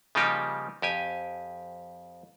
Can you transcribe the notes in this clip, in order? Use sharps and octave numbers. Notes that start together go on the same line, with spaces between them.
C#3 F3 G3 A#3 D#4 G4
F2 G4 G#5